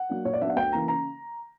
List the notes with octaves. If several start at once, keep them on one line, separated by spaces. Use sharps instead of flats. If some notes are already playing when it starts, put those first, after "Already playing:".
Already playing: F#5
F#3 A#3 D4
A#2 C#5
D5
F#3 B3 D4 E5
F#5
D2 G5
C#3 E3 A#3 A#5
C#3 A#5